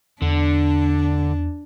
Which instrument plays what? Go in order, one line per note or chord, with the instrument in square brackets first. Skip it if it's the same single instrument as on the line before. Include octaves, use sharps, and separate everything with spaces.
[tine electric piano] E2 [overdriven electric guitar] D3 [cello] D4